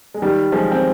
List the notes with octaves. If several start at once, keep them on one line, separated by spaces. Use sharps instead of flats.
G#3
D#3 G3
F3 G#3
C4